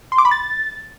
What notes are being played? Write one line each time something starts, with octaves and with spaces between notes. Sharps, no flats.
C6
D6
B5
A6